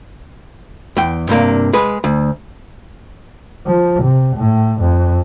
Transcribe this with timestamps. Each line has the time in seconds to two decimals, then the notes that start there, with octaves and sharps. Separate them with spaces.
0.97 E2 G5
1.29 G2 C3 A#3 D4
1.73 G#3 G#4 B4
2.04 D2
3.66 F3
4.03 C3
4.37 A2
4.81 F2